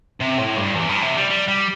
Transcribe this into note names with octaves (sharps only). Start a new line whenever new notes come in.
C3
A2
G2
E2
G2
C3
G3
G3
G3